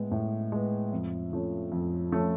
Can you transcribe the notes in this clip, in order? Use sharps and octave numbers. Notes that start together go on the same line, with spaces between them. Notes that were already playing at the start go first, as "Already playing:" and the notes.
Already playing: A2 G#3 B3
A2
G#3 B3
F2
F3 A3 C#4
F2
F3 A3 C#4